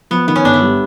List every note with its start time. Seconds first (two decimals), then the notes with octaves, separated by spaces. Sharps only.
0.11 F3 B3
0.27 D#3 B3
0.36 C#4
0.44 G1 D4
0.54 E4
0.62 G3